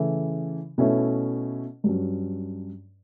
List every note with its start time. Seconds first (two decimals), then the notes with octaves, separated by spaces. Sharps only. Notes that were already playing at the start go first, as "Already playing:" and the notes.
Already playing: C#3 E3 A3 E4
0.78 B2 A3 C#4 E4
1.84 G2 F#3 C#4